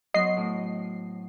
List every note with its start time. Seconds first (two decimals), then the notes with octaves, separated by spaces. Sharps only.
0.14 F#3 B3 C5 D#5 C7
0.37 A2